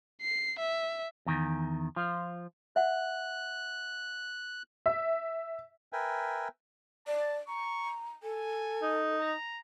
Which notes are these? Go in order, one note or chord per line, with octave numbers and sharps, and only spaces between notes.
C7
E5
E2 D#3
F3 F4
E5 F#5 F#6
E5
A#4 B4 E5 G5 G#5
D5 A5
A#5 C#6
A4 G#5
D#4
A#5